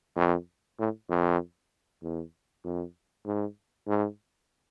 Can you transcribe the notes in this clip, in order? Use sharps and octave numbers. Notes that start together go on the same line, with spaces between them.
F2
A2
F2
E2
F2
G#2
G#2